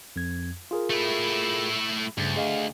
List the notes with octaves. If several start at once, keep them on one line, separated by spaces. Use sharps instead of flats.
F2 G#6
F4 G#4 A#4
A3 E4
D2 G2 C#3 A6
G#4 D#5 F5